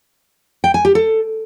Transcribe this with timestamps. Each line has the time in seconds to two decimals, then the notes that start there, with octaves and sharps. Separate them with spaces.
0.64 G5
0.74 G#5
0.85 G4
0.95 A4